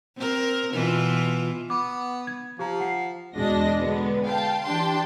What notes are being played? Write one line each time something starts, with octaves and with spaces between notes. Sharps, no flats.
C4 A#4
B2 E3 F4
B3 D6
G#6
F3 G4 A#5
F#5 C7
E2 B2 G#3 D4 D#5 A#6
D3 G#3 B3
F5 G5 A5
E3 D4 G4 G5 A5 C6